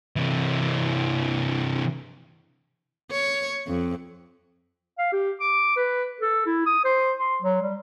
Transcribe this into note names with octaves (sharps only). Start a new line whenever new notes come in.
C3 E3
C#5
F2
F5
G4
D6
B4
A4
E4
D#6
C5
C6
F#3
G3